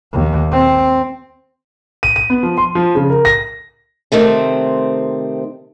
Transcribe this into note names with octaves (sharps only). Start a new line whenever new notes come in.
D#2
C4
D#7
D#7
B3
F3
C6
F3
C#3
A#4
A#6
C3 D#3 A3 C4